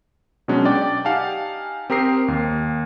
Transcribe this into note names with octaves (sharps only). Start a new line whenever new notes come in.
B2 F#3 G#3 C#4 D4
D5 G5 D6
D#4 G4 F5 F#5 G#5 A5
C4 G4 A#4 D#6 C7
D#2